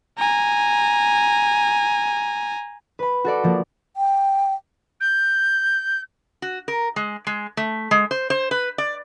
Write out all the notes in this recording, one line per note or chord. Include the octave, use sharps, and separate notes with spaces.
G#5 A#5
B4 B5
F#4 A4 D5
F3 A#3
G5
G6
F#4
A#4
G#3
G#3
A3
G#3
C5
C5
B4
D5